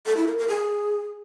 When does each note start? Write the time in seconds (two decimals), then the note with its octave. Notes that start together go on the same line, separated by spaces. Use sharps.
0.06 A4
0.17 E4
0.27 A#4
0.38 A#4
0.48 G#4